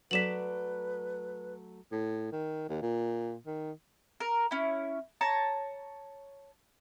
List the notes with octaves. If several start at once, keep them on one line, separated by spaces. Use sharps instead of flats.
F#3 A3 B4 D5 B6 E7 F#7
A2
D#3
D#2
A#2
D#3
A#4
C#4 E4
C#5 A5 A#5